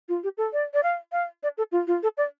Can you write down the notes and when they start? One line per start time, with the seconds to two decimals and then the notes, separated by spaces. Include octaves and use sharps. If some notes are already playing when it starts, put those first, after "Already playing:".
0.09 F4
0.23 G4
0.37 A4
0.53 D5
0.74 D5
0.83 F5
1.12 F5
1.43 D5
1.58 A4
1.72 F4
1.87 F4
2.03 A4
2.17 D5